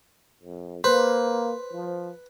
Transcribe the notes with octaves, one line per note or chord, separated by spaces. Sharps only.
F2
A#3 B4 C5
F3